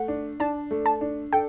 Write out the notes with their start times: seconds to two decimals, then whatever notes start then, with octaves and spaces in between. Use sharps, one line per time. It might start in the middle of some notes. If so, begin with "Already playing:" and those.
Already playing: A3 F#5
0.08 D4
0.40 D4 A5
0.71 A3
0.86 A5
1.01 D4
1.32 A4 G5